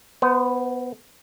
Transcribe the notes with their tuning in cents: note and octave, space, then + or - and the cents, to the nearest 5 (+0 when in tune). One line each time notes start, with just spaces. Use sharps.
B3 +5 C5 -30